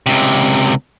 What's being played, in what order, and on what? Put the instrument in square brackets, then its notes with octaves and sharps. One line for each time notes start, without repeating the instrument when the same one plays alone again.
[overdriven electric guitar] C#2 C3